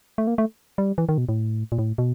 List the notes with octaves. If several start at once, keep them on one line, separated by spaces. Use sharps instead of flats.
A3
A#3
A3
G3
E3
D#3
B2
A2
A#2
A2
B2